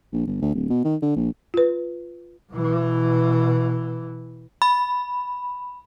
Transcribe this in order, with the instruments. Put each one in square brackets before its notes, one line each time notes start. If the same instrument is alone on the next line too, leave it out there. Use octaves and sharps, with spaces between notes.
[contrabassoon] A#1
G1
D2
D1
B2
D#3
D3
A#1
[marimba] F4 B4
[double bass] B2 E3
[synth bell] B5